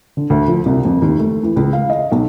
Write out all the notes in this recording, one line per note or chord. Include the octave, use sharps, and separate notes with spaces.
D3
D2
F3
C2
F2
D#2
A3
E3
C#2
F5
D#5
B1